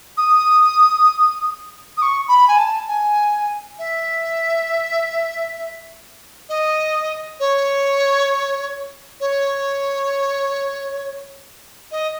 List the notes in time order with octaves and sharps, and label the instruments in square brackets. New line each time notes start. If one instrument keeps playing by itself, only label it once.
[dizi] D#6
D#6
C#6
B5
G#5
A5
G#5
E5
D#5
C#5
C#5
D#5